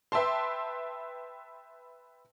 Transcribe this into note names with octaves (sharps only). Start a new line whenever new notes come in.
B4 E5 G5 A5 C6